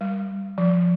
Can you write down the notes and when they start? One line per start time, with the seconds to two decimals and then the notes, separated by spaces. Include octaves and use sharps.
0.01 G3
0.58 F3